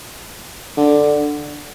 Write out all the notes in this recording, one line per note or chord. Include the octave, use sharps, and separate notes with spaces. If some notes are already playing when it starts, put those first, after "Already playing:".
D3